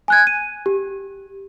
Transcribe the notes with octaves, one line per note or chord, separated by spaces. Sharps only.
G#5 F#6 G#6
D#7
G4